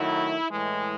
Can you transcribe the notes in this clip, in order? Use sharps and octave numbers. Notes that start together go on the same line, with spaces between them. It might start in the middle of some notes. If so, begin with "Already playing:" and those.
Already playing: D#3 F#3 A3 E4
A2 E3 G#3